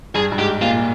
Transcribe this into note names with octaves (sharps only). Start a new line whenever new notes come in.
G2 G#4
G2
G#2 G4
A#2 F4